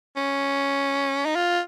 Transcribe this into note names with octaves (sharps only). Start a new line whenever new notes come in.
C#4
D#4
F4